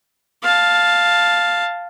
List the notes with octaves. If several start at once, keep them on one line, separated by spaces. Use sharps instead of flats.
F5 A5